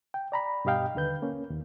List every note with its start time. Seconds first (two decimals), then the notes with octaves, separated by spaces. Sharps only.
0.14 G5
0.32 D5 A#5 B5
0.65 G2 B2 G4 D#5 F5 G5
0.95 D#2 D3 B4 G6
1.22 A#3 C#4
1.50 D#2